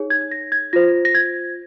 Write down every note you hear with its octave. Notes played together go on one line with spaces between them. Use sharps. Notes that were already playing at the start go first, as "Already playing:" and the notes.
Already playing: D#4 G#4 C#5
G#6
G#6
A#6
G#6
F4 C5 A#6
A#6
G#6